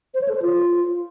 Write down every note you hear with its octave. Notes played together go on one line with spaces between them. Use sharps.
C5
C#5
A4
C5
F4